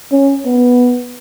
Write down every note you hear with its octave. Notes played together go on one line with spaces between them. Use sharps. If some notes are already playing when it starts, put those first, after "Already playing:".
C#4
B3